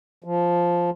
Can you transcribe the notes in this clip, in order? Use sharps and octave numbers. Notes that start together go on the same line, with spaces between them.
F3